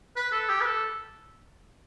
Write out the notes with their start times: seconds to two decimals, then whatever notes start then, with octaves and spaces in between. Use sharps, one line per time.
0.17 B4
0.32 A4
0.49 G4
0.61 B4
0.66 A4